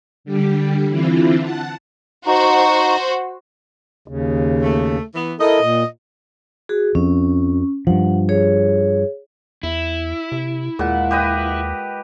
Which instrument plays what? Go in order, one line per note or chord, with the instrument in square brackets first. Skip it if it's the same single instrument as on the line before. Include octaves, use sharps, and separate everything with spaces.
[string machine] D3 G3 G4
D3 E3 C4 E4 F4
F#5 A5
[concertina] D#4 [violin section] F#4 C5
[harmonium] D#2 C#3
[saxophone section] A3
E3 B3
[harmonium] E4 A4 A#4 [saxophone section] D#5
[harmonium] A#2
[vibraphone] F#4 G#4
[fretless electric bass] F2 [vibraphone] C#4
[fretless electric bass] G2 F3 [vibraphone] F#5
[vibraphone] G#4 C#5
[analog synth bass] E2 [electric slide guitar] E4
[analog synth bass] C3
[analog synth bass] D#2 [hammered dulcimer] A#2 [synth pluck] G#3 F#5
[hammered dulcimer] G4 B4 D#5